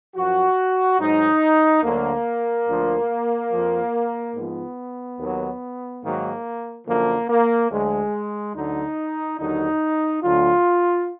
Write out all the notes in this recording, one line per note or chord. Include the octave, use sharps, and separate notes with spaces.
F#2 F3 F#4
G#2 F#3 D#4
D2 D3 F#3 A#3
D2 D3 F3
F2 F3
G#2 F3 B3
D#2 D#3 F#3
G#2 D#3 F#3 A#3
F#2 D3 F3 A#3
A#3
D2 D3 F#3 G#3
D2 D3 F#3 D#4
D#2 D3 F#3 D#4
D2 D3 F#3 F4